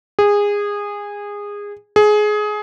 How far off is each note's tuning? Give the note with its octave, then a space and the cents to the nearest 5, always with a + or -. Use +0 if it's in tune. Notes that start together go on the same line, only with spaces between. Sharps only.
G#4 -20
G#4 +20